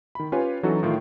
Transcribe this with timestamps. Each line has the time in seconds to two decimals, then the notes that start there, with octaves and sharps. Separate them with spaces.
0.15 D#3 B5
0.32 C#4 F4 G4 B4 C#5 G#5
0.63 E3 F#3 C#4 D#4 F#4 A4
0.83 A2 D#3 F4